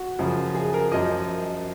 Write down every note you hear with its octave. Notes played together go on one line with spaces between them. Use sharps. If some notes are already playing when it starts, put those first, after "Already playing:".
Already playing: F#4
F#2 C#3 F3
G#4
A#4
F#2 F3 D#5